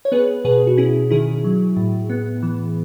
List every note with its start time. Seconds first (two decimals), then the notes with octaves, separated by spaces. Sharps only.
0.05 C#5
0.12 B3 G#4 B4
0.45 B2 G#4 B4
0.67 F#4
0.77 C#4 E4 G#4
1.11 D#3 E4 G#4
1.44 F#3
1.77 A2
2.10 B3
2.43 E3